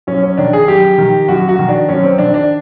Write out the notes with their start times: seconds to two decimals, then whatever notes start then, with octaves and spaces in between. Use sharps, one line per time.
0.07 F#2 C#4
0.23 C#4
0.38 D#3 D4
0.53 G#4
0.68 F#2 G4
0.98 D#3
1.28 F#2 F#4
1.49 F#4
1.59 D#3
1.69 D4
1.89 F#2 C#4
2.03 C4
2.18 D#3 D4
2.34 D4